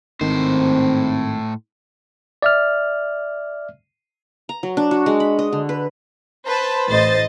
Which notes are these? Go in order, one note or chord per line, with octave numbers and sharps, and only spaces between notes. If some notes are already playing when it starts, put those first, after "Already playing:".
G#1 A2 D#3 C4 C5
D5 E5 F6
A#5
F#3
D4
F#4
G#3
B5
D#5
D3
B4
B4 C5 A5
A1 C5 D#5 A6